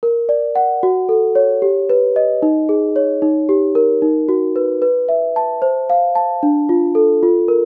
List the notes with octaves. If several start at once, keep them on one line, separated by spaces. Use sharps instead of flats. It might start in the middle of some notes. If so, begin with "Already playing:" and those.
A#4
D5
F#5
F#4
A4
C#5
G4
B4
D#5
D#4
G#4
C#5
D#4
G4
A#4
D#4
F#4
B4
B4
E5
A5
C5
F5
A5
D4
F4
A4
F4
A#4